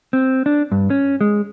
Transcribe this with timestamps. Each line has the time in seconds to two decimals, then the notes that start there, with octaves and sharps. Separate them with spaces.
0.13 C4
0.46 D4
0.72 G2
0.90 C#4
1.21 G#3